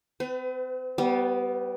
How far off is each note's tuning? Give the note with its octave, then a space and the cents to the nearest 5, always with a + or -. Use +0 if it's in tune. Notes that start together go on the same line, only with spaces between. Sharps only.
C4 -40 B4 +35
G3 -20 B3 +5